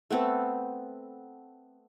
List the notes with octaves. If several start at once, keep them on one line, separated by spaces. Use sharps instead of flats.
A3 B3 C4 A4